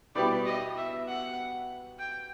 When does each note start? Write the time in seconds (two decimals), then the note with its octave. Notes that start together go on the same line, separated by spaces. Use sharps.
0.15 B2 G3 B3 E4 G4 D5
0.46 D#5
0.77 E5
1.07 F#5
1.99 G5